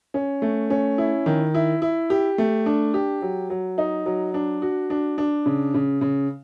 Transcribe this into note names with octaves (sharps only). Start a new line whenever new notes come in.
C#4
A3
C#4
E4
D#3
E4
E4
G4
A3
D4
G4
F#3
F#3
D#4
F#3
D4
F#4
D4
D4
C#3
C#3
C#3